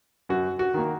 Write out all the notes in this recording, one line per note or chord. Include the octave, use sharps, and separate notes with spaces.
F#2 F#4
F#4
D#3 A#3